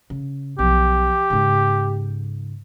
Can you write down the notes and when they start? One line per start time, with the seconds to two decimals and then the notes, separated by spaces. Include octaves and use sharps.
0.10 C#3
0.59 B1 F3 G4
1.30 G#2 C#3